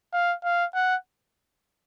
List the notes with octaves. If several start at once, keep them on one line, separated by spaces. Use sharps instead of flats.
F5
F5
F#5